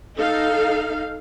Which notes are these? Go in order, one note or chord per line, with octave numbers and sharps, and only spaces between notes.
D#4 A4 F5